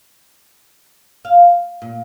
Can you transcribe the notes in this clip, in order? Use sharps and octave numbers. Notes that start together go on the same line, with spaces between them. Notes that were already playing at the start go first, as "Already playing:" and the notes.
F5
A#2